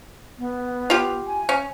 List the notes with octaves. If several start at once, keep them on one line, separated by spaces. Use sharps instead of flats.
B3
F4 G4
G#5
C#4